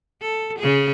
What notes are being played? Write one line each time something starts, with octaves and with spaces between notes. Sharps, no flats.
A4
C#3 G#4